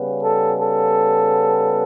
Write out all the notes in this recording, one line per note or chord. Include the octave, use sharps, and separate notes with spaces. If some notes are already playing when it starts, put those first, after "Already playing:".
Already playing: C#3 G3 B3
A4
A4